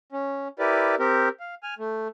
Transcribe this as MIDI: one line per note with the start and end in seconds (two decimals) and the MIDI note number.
0.12 0.48 61
0.59 0.95 64
0.59 0.95 67
0.59 0.95 70
0.59 0.95 71
0.59 0.95 74
0.99 1.29 60
0.99 1.29 67
0.99 1.29 70
1.40 1.55 77
1.63 1.74 80
1.63 1.74 89
1.79 2.08 57